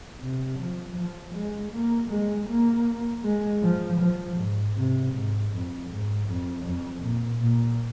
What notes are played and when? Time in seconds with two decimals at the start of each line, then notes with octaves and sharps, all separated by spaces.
0.21 C3
0.59 F3
0.97 F3
1.34 G#3
1.73 A#3
2.11 G#3
2.49 A#3
3.24 G#3
3.63 F3
4.00 F3
4.37 G#2
4.76 C3
5.13 G#2
5.52 F2
5.90 G#2
6.28 F2
6.66 F2
7.03 A#2
7.42 A#2